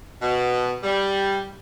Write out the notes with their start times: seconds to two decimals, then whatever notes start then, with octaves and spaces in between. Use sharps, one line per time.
0.22 B2
0.84 G3